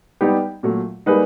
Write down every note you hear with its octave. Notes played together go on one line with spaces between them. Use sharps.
G3 B3 D#4 G4
A#2 F#3 A3
G3 A#3 D#4 G#4 B4